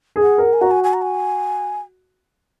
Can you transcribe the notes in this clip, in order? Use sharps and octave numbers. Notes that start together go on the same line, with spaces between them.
G#4
F#5
A#4
G#5
F#4 A#5
G#5
G#5
A#5
G#5